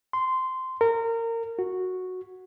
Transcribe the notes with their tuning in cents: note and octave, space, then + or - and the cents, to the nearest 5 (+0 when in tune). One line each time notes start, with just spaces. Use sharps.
C6 -15
A#4 -25
F#4 -5